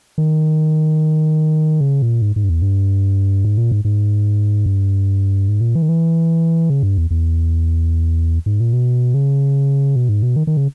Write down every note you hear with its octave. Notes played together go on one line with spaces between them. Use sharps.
D#3
C#3
A#2
G#2
G#2
G2
E2
G2
G#2
A#2
G#2
G#2
G2
G#2
A#2
E3
D#3
E3
C#3
G2
E2
E2
G#2
A#2
B2
C#3
B2
G#2
B2
D#3
D#3
C#3